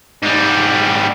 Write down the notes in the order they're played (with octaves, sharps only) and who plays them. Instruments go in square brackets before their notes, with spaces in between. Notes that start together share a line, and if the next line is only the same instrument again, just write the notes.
[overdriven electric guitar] G#2 G3